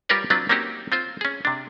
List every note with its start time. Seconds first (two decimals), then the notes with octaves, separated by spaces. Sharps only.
0.09 G3 F4 G4 A#4 B4 C#5
0.30 F#3 C4 D4 F4 B4
0.49 A#3 C4 C#4 D#4 F#4 G4
0.92 C4 F4 C5
1.21 C#4 G#4
1.45 C3 D4